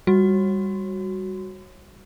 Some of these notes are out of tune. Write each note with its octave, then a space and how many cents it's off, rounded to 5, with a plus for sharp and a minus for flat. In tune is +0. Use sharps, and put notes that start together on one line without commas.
G3 +10 F#4 +0